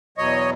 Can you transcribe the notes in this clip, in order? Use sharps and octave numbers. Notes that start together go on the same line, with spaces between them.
E2 B2 F#3 C#5 D#5